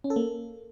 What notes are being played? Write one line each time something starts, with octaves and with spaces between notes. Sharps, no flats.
C#4
A4
A#3